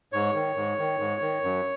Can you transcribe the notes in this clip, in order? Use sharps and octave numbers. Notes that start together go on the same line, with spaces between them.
G#2 C#5
D#3
G#2
D#3
G#2
D#3
F#2